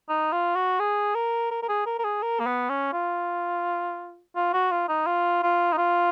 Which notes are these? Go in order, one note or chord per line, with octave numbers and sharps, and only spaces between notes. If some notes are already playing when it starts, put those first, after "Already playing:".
D#4
F4
F#4
G#4
A#4
A#4
A#4
G#4
A#4
A#4
G#4
A#4
A#3
B3
C#4
F4
F4
F#4
F4
D#4
F4
F4
D#4
F4